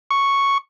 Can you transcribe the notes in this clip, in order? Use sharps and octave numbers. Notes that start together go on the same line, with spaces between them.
C#6